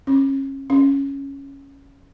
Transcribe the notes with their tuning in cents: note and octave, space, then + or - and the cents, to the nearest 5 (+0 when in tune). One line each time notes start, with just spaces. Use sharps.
C#4 -30
C#4 -5